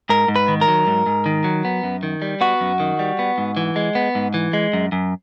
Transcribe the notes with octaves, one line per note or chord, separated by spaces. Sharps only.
G#2 A#4
G#2
B4
D#3
A#4
F#3
G#2
G#2
D#3
F#3
B3
F#2
D#3
G3
B3 F#4
F#2
D#3
G3
B3
G#2
E3
G#3
B3
G#2
E3
G#3
F#2
F#2